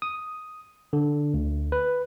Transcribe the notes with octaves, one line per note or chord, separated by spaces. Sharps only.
D#6
D3
D2
B4